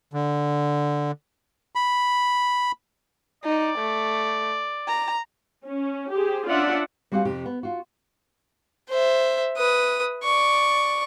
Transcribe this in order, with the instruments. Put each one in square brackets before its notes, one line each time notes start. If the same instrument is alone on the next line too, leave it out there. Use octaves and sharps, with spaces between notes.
[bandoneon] D3
B5
[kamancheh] D#4 [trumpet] D5
[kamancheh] A3
A#5
[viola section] C#4
G4 G#4 C5
C#4 D4 F4 D5 E5 F#5
[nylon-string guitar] G3 C4 F#4 G4 F5 G#5
F2 C3 G4
B3
F4 F#4
[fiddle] C5 E5
B4 D#6
D5 C#6